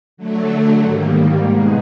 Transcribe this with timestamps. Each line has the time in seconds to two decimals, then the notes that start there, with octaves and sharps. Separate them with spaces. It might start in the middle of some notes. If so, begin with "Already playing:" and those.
0.17 D3 F#3 A3
0.83 G#2 D#3 G3 A#3
1.49 B2 G#3 B3 D#4 G#4